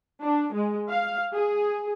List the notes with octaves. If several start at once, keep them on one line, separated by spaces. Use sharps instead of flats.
D4
G#3
F5
G#4